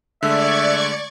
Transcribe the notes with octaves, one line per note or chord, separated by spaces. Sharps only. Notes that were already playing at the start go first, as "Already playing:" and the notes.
D3 G#3 A3 D5 E5 C#6 G#6